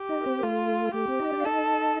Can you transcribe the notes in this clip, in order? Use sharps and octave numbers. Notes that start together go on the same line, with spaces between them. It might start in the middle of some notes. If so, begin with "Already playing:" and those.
Already playing: G4
D#4 D#5
A#4
C4 C5
A#4
A3 F4 A4
A3 G4 A4
C4 C5
D#4 D#5
D4 D5
F5
D#4 A4 D#5